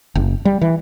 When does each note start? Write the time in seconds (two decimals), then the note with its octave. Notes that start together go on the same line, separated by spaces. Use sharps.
0.15 F#1
0.45 G3
0.62 E3